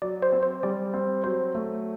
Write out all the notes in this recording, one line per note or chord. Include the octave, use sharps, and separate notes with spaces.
F#3 D5
C5
C4
C5
G3 D5
C4
F#3 C5
A3